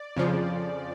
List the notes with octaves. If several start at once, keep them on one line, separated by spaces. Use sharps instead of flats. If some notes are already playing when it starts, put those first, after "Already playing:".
Already playing: D5
F2 C#3 F3